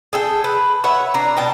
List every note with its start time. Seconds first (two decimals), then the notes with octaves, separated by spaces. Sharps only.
0.13 G#4 A4 G5
0.44 B4
0.84 B4 C#5 E5 F#5
1.14 D4 A#5
1.37 B2 G5 A5